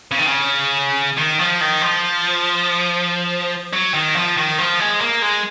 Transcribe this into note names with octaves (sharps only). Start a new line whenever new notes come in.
C#3
D#3
C#3
D#3
F3
D#3
F3
F#3
D#3
F3
D#3
F3
G#3
A#3
G#3